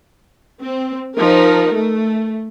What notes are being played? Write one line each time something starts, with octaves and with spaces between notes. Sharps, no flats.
C4
F3 D#4 A#4
A3